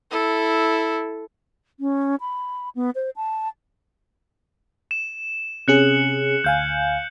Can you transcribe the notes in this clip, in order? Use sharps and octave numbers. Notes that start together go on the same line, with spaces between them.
E4 A4
C#4
B5
B3
C5
A5
E7
C3 C#4 G#4 F#6 C#7 F#7
D2 F5 G#5 G6